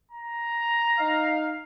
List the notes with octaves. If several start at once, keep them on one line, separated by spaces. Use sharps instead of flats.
A#5
D#4 F5